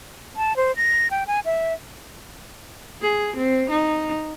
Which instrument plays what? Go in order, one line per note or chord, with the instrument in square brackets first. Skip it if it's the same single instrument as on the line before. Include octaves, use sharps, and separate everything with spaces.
[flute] A5
C5
A#6
G5
G#5
E5
[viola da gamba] G#4
C4
D#4